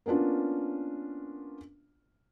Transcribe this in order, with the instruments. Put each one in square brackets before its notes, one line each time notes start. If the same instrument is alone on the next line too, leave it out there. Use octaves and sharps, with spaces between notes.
[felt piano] A#3 B3 C#4 D4 F4